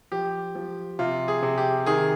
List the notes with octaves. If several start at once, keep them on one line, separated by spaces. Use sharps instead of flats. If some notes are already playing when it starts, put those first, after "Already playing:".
F3 G4
F3
C3 F4
G#4
C3
G4
D#3 G#4